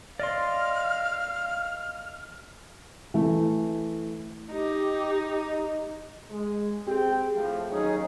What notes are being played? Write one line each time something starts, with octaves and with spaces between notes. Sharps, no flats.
D5 D#5 F5 C6 F6
E3 A3
D#4 G4
G#3
C4 G4 G#4 G5
A2 F3
D#2 F#3 C#4 D#4 G#4